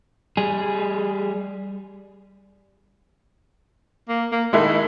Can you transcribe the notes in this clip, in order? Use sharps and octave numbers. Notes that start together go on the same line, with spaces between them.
G3 G#4
A#3
A#3
D#3 G#3 E4 A4